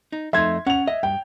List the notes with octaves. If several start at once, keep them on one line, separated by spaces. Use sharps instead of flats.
D#4
F2 A3 D#4 E5 C6 G#6
C#4 F#5 F7
D#5 E5
G2 G5